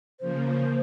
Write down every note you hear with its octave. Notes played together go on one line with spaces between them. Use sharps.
C#3 F3 A#3 C5